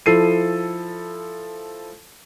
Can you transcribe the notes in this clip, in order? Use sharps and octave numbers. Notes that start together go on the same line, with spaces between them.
F3 E4 A4 C7 D#7